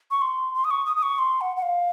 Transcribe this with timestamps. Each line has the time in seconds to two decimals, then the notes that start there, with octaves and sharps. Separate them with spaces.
0.11 C#6
0.22 C6
0.55 C6
0.64 D#6
0.71 C#6
0.86 D#6
0.97 D#6
1.03 C#6
1.19 C6
1.41 F#5
1.57 F#5
1.62 F5